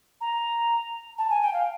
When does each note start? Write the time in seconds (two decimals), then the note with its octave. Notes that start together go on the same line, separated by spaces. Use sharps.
0.21 A#5
1.18 A5
1.30 G#5
1.42 G5
1.53 F5